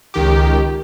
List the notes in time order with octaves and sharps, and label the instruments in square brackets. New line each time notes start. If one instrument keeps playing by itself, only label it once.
[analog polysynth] C#2 D#3 G4